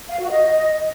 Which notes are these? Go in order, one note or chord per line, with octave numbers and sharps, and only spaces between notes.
F5
F#4
D#5